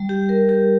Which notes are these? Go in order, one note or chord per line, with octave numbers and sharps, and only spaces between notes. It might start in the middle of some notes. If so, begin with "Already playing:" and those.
Already playing: G3
G4
A#4
G4